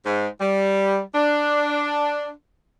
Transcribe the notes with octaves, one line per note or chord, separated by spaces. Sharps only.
G#2
G3
D4